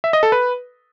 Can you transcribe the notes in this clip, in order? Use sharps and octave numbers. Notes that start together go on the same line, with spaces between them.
E5
D#5
A4
B4